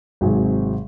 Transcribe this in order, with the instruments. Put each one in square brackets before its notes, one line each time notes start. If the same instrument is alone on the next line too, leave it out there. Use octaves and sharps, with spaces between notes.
[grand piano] G#1 G#2 C3 F#3 G#4